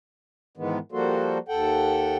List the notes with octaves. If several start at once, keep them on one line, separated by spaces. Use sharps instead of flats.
G#2 D#3 E3 G#3 B3
F3 G3 A#3 F#4 A4 C5
D#2 A4 F#5 G5